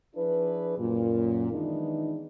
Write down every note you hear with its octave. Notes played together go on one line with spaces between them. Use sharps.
F3 D4 E4 G#4 B4
F#2 A#2
D#3 E3 G#3 B3 D4 D#4